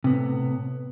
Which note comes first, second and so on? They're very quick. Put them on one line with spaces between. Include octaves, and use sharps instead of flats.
C3 B3 A2